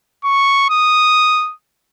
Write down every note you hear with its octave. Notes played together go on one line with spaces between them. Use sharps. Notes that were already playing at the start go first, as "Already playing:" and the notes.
C#6
D#6